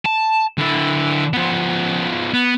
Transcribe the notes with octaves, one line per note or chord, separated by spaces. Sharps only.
A5
D3 E4
F3 B3
B3